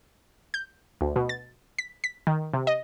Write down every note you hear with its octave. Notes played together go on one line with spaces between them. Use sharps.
G6
D2
B2
A6
B6
B6
D#3
C3
D#5